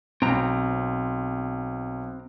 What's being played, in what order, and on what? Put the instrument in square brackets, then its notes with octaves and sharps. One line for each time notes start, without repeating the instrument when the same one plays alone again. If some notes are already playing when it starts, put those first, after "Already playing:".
[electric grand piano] B1 [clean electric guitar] C4 A#5